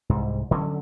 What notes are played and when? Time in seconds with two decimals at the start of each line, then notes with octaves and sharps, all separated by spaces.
0.09 C2 G#2
0.51 D3 F#3 C#4